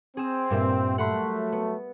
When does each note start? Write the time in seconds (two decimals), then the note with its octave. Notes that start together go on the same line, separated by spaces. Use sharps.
0.17 C4 G#4 E7
0.50 G2 A#2 E5
0.98 F#3 A3 F#5 B5 C6
1.52 B3